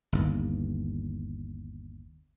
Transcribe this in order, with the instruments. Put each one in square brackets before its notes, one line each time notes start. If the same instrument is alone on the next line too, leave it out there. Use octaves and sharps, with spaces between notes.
[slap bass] G1 D#2